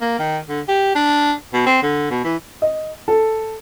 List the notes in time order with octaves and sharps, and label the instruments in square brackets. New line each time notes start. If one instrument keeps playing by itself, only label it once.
[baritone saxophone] A#3
D#3
D3
G4
D4
B2
C4
D3
B2
E3
[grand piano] D#5
A4